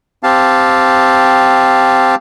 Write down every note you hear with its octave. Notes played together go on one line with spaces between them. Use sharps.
C4 G4 F5 A5